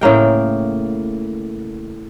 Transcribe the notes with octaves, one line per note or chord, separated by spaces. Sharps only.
A2 C#3 A#3 G5